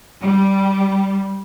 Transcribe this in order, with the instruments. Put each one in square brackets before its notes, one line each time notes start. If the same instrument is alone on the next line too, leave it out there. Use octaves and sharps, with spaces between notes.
[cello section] G3